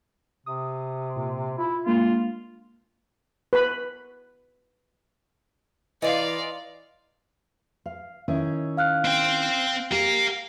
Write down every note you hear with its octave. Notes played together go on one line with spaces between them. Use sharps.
C3 D#6
A#2
E4 F4
G#3 A#3 D4 F4
B4 B5
E3 D#4 F4 D5 F5
F5
D#3 C#4 E4
F5 F6 F#6
C4 G5
G4 A#4 F5